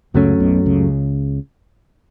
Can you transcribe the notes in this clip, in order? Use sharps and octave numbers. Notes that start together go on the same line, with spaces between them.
C#2 F#2 C#3 F#3 A3 C#4
B1 B2
C#2 C#3